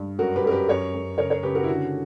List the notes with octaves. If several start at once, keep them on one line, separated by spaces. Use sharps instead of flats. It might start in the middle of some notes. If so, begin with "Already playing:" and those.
Already playing: G2
F#2 F#4 A#4
G4 B4
F#2 A#4
G4 B4
F#2 A#4 C#5
F#2
C#3 A#4 C#5
A#4 C#5
C#3 G4 B4
F#4 A#4
E4
D3 F#4